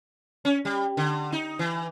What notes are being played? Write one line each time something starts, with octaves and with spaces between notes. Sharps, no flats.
C#4
G3
D3
D#4
E3